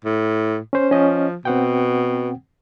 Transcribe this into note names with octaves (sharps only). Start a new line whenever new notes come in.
A2
C#4 C5
F3 C#4 D#5
B2 C4 F#5 G5